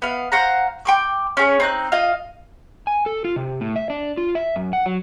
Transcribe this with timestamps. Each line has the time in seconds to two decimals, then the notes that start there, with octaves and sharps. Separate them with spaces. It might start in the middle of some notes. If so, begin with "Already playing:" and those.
0.02 B3 F5
0.32 C5 F5 F#5 A#5
0.85 G5 C6 D6
1.37 C#4 G#4 C#5
1.60 C4 D#4 F#6
1.92 F4 D#5 F5
2.87 G#5
3.06 A4
3.25 F4
3.36 C3
3.61 A2
3.76 E5
3.90 D4
4.17 F4
4.35 E5
4.56 F#2
4.73 F#5
4.86 F#3